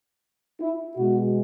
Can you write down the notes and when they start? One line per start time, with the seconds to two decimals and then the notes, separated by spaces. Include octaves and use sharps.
0.60 E4
0.97 B2 G#3 F#4